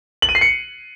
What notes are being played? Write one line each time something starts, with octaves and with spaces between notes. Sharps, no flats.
F#7
D#7
C7
C#7